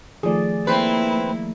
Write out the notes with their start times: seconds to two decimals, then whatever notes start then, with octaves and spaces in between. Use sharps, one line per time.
0.23 D#3 F3 A3 G#4 D5
0.67 A#3 C4 E4 B4